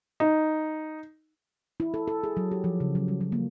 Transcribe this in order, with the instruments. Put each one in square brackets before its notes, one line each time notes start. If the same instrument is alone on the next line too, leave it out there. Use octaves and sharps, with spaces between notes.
[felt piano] D#4
[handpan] E4
A4
A4
G#4
F#3
G4
F3
C#3
F#3
G3
F#3
A#3